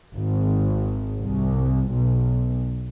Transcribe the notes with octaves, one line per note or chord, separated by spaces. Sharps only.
G#1
C2
B1